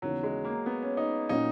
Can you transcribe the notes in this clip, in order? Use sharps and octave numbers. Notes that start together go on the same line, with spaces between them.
D#2 C#3 E3 F#3 B3
G#3
A#3
B3
C#4
D#4
A#2 F#3 C#4 D#4 F#4